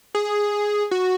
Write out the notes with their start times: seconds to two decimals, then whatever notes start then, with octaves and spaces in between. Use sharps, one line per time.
0.15 G#4
0.91 F#4